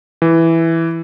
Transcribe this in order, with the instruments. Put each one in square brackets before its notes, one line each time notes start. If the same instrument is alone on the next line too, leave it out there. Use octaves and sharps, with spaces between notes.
[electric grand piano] E3